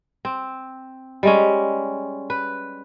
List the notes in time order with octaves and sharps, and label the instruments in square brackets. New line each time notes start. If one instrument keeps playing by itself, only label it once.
[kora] C4
G3 G#3 C#4
B4